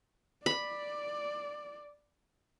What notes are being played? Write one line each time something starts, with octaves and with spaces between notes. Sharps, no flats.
D5 B5